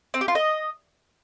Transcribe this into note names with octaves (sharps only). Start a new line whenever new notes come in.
C4
G4
F4
D#5